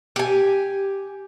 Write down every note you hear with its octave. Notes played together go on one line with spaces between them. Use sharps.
G4 G#5